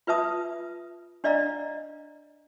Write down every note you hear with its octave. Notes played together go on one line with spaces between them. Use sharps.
F4 B4 E5 A5 D#6
D4 D5 D#5 F5 A#5